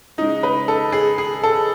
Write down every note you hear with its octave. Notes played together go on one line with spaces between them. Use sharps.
C#3 G#3 D#4
B4
A4
G#4
G#4
A4